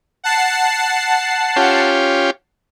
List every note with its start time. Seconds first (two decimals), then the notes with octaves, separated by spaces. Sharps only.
0.24 F#5 A5 C7
1.56 C#4 F4 G4